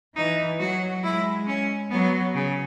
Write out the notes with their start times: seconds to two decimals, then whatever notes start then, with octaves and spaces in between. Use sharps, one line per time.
0.16 E3 D#4
0.60 F#3 F#4
1.03 G#3 E4
1.47 C#4
1.91 F#3 B3
2.35 C#3